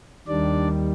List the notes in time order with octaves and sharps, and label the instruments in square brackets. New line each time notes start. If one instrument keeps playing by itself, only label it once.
[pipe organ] D#2 D#3 G3 D4 D5